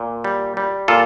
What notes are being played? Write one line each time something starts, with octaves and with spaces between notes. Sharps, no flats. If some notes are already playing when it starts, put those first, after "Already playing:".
Already playing: A#2
G3
G3
A#2 F4 A4